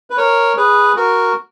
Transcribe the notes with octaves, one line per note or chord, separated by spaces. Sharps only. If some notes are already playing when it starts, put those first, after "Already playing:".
B4
A#4 C#5
G#4 B4
F#4 A#4